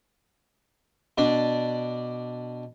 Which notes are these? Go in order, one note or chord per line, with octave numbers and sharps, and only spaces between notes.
B2 D4 D5